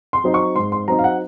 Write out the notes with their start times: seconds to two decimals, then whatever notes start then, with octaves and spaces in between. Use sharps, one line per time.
0.13 C6
0.24 F#3 C4 D#4
0.34 C#6
0.56 G#2 C6
0.72 C6
0.88 F#3 C4 D#4 A#5
0.99 F5
1.04 F#5